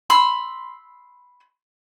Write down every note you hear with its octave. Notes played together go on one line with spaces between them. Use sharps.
B5 C6 E6